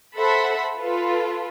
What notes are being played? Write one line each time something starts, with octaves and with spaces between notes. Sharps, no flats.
A4 C5 E5 F#5 B5
F4 A4 B4